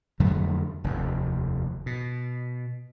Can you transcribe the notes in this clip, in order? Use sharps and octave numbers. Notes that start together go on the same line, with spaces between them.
F2 D3 F#3 A3
F1 D#2
B2